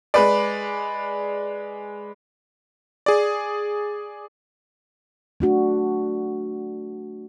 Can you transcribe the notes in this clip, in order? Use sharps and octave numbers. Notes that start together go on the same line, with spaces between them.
G#3 B4 D5
G#4 D5
A3 D4 F#4